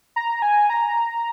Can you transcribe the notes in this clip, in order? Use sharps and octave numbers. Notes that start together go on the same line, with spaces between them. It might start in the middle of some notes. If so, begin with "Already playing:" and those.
A#5
G#5
A#5